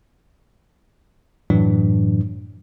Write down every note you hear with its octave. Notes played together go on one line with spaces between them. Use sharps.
F#2 A2 E3 F#3 D4